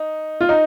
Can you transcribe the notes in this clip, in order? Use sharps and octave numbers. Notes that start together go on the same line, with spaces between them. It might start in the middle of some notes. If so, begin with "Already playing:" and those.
Already playing: D#4
F4
D#4